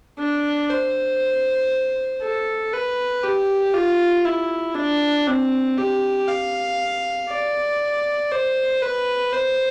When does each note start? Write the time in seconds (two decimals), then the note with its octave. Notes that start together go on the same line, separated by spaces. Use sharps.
0.19 D4
0.70 C5
2.22 A4
2.73 B4
3.23 G4
3.74 F4
4.25 E4
4.75 D4
5.27 C4
5.77 G4
6.28 F5
7.29 D5
8.31 C5
8.82 B4
9.32 C5